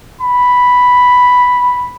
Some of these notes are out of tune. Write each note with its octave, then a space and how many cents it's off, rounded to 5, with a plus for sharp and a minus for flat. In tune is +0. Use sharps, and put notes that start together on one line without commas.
B5 +0